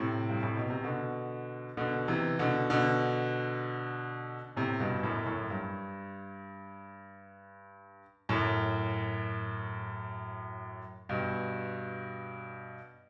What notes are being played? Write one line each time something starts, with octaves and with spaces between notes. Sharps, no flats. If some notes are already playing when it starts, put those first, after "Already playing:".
Already playing: A2 C3
G2
A2
B2
C3
B2 D3
B2 D3
C3 E3
B2 D3
B2 D3
A2 C3
G2 B2
F#2 A2
F#2 A2
G2
F#2 A2
G2 B2